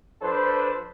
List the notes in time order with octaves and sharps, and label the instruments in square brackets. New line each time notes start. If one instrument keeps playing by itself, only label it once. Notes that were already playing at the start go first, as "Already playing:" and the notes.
[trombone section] F3 D4 A4 B4 C5